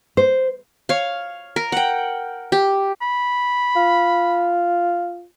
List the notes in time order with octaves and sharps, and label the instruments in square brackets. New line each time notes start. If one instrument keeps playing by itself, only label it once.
[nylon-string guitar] C5
[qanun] C#5 F5
A#4
F#5 G5
G4
[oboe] B5
[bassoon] F4